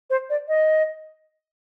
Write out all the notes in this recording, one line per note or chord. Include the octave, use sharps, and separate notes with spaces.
C5
D5
D#5